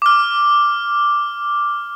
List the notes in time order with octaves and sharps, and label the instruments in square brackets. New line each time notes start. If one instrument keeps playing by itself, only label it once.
[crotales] D6 F6